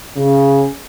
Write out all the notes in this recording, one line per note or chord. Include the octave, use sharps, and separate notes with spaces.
C#3